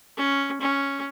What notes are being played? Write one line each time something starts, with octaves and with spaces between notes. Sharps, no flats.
C#4
C#4